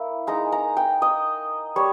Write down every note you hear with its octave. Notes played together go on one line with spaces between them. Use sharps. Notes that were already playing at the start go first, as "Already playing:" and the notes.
Already playing: A#3 E4
G#3 D#4 A#5
A#5
G5
D#5
G3 C#5